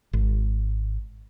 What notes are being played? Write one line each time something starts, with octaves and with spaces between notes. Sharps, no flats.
G#1